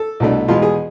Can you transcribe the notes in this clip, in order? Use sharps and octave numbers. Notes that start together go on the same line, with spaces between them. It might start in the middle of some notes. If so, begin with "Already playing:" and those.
Already playing: A4
C2 B2 A3 D4
E2 B2 G#3 F4
G#4